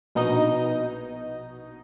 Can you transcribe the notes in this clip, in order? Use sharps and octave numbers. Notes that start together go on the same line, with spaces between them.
A#1 B2 D#4 D#5